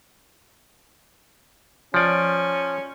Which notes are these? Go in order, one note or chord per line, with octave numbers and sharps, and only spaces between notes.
F3 C#4 D5